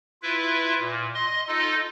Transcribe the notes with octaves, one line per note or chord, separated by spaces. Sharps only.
E4 F4 B4 E5
A#2
D#5 C6
D#4 F4 A4 D#5